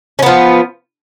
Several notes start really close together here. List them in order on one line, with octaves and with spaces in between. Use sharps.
C#4 B3 F3